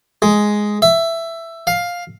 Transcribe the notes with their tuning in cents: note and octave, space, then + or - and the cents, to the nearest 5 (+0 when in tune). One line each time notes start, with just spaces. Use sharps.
G#3 +5
E5 +10
F5 +10